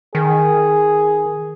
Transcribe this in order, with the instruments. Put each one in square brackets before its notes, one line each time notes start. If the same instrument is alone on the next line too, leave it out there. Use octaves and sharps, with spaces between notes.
[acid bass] D#3 [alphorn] G#4